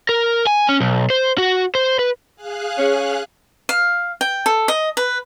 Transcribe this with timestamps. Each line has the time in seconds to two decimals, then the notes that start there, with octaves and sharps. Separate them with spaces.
0.09 A#4
0.47 G#5
0.69 C#4
0.81 B1
1.10 C5
1.38 F#4
1.75 C5
1.99 B4
2.36 G#4 F5 F#6
2.78 C#4
3.69 F5
4.21 G5
4.46 A4
4.68 D#5
4.97 B4